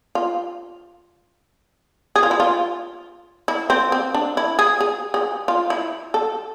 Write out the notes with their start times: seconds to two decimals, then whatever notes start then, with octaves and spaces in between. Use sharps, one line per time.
0.15 F4
2.16 G#4
2.23 F4
2.31 E4
2.40 F4
3.48 E4
3.70 C4
3.92 C4
4.14 D4
4.37 E4
4.59 G#4
4.80 G#4
5.14 G#4
5.48 F4
5.70 E4
6.14 A4